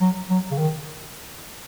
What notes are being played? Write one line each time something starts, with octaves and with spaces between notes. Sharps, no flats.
F#3
F#3
C#3
D#3